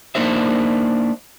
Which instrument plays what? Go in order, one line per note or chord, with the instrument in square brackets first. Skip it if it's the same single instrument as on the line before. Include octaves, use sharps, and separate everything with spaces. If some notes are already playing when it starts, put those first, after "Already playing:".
[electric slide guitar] A#3 D4 D#4 A#4 C5 E5